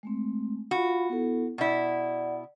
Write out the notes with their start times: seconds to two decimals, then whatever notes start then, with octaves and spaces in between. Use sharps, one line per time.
0.03 G#3 A3 C4
0.71 F4 F#4 F5 B5
1.09 B3 E4 A4
1.58 B2 E4 D5 F#5